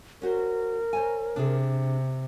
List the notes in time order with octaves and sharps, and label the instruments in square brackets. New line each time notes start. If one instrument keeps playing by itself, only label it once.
[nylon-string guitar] C#4 F#4 C5 [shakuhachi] A#4
[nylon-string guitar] C5 C#5 G#5
[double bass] C3 [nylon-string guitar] D4 G#4